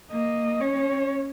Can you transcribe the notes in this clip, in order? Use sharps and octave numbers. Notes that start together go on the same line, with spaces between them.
A#3 D#5
C#4 C#5